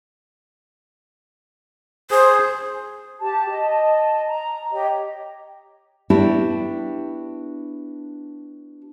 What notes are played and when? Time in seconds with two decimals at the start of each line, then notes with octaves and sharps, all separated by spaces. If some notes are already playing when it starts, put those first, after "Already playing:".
2.11 G#4 C5
3.20 G4 A5
3.49 D#5 A5
4.26 A#5
4.72 G4 C#5 D#5
6.10 B3 D4 E4 F#4 G4